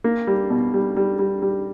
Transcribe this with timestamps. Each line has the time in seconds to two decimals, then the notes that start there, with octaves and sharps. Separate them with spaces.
0.04 A#3
0.27 G3
0.50 B2
0.74 G3
0.96 G3
1.19 G3
1.42 G3